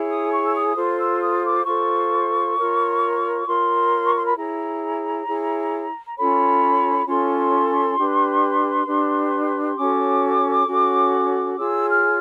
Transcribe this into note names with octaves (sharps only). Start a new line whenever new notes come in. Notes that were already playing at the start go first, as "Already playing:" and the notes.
Already playing: E4 G#4 C#5
D#6
C#6
E6
D#6
F4 A4 C5
E6
D#6
D6
F4 A4 C5 C#6
F4 A#4 C#5
F4 A#4 C#5 C6
C#6
C6
B5
E4 G#4 C#5 A#5
E4 G#4 C#5
A#5
C#4 F4 A4 C#5 B5
C#4 F4 A4 C#5 C6
D4 G4 B4
D4 G4 B4
C#4 F#4 A4 C#5 D6
C#4 F#4 A4 C#5
F4 G#4 C#5 E6
F6